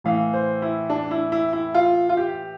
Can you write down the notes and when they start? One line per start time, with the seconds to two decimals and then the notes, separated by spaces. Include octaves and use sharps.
0.04 A2 E3 F5
0.34 C5
0.62 E4
0.90 D4
1.11 E4
1.32 E4
1.53 E4
1.75 F4
2.09 F4
2.17 G4